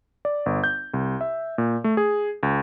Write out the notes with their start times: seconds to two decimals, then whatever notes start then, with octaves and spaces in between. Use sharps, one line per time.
0.25 D5
0.46 G1
0.64 G6
0.94 C2
1.21 E5
1.58 A#2
1.84 A3
1.97 G#4
2.43 C#2